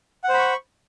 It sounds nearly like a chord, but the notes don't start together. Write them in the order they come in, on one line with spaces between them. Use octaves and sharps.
F#5 C5 B5 C#6